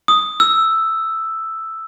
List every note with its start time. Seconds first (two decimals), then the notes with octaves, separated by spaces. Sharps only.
0.08 D#6
0.40 E6